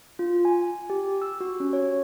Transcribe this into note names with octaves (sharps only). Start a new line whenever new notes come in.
F4
G#5
G4
E6
F#4
C#4
C#5